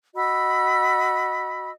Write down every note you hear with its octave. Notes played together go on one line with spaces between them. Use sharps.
F#4 D#5 B5 E6